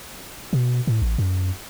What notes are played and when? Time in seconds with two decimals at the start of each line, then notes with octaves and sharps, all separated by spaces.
0.53 B2
0.87 A2
1.01 A1
1.18 F#2